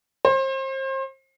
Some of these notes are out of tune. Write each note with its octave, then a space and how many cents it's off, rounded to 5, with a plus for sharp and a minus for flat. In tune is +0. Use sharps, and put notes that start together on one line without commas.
C5 +35